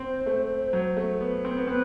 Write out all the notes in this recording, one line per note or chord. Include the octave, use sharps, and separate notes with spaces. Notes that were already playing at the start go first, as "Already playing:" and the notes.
Already playing: C4 C5
A3
F#3
A3
B3
C4
B3
C4 B4